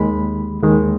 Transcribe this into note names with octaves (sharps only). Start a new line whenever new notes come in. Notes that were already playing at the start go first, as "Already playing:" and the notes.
Already playing: D#2 D#3 G#3 B5
D#2 D#3 G#3